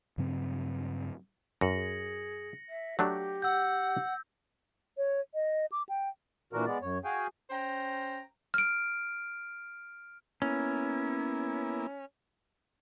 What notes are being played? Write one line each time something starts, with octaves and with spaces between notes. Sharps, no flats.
G2 C#3 F#3 C4
F#2 A#6 C#7 F#7
G#4
E5
F#3 A3 D4 G4
F#5 E6 G6
C#5
D#5
D6
G5
A#2 D3 E3 D4 F#4 A#4
G#3 B3 D5
F#2 C#5
F#4 G#4 F5 G5 G#5
C#4 C5 G5 A#5
F6 D7
A#3 B3 C#4 E4